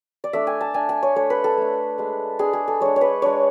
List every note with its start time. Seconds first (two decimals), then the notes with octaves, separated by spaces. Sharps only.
0.24 D5
0.33 A3 D4 E5
0.47 G#5
0.61 A5
0.74 A3 D4 G#5
0.89 G#5
1.03 C#5
1.16 A3 D4 C#5
1.30 B4
1.44 A4
1.57 A3 D4
1.98 G#3 D4
2.39 G#3 D4 G#4
2.53 G#4
2.68 A4
2.81 G#3 D4 C#5
2.96 C#5
3.01 B4
3.22 G#3 D4 C#5